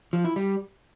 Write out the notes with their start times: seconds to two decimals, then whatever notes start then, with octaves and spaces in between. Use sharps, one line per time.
0.13 F3
0.25 E4
0.36 G3